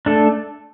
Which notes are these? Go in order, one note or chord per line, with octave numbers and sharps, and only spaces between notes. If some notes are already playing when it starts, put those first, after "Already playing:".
A3 D4 A4